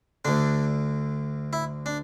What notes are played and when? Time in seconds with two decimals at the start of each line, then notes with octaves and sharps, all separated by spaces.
0.25 D2 D3 D4
1.53 E4
1.86 D4